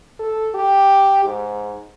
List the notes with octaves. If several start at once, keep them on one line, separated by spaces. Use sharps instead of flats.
A4
G4
G#2